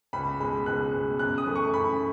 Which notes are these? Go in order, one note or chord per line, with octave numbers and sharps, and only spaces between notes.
C#2 B5
B2 G#3 B5
C#2 F#6
B2 G#3
F#2 F#6
D#6
E3 A3
C#6
F#2 B5